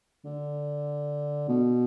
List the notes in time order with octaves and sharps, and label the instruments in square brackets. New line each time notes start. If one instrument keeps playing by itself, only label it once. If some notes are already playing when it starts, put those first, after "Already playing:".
[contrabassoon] D3
B2